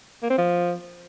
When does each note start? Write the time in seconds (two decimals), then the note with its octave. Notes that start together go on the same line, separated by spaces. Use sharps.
0.22 A#3
0.30 C4
0.38 F3